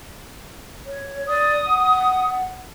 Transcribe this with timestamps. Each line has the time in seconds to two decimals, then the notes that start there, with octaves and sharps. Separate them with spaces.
0.86 C#5
1.28 D5 D#6
1.67 F#5